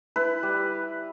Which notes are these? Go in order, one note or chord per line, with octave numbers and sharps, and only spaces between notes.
E4 B4
G3